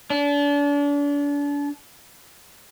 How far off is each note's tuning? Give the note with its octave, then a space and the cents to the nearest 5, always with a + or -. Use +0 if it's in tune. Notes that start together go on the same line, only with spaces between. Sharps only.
D4 -35